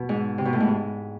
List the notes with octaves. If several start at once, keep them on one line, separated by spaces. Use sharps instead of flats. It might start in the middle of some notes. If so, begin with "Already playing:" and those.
Already playing: B2
G#2
C3
B2
A2
G#2